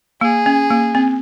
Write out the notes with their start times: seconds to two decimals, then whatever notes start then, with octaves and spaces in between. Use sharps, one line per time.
0.21 A#3 G#4
0.46 C#4
0.70 A#3
0.95 C4